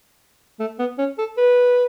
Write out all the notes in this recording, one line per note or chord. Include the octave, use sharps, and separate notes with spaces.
A3
B3
C#4
A4
B4